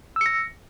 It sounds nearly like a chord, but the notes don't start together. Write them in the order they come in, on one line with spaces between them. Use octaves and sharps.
E6 C#7 A#6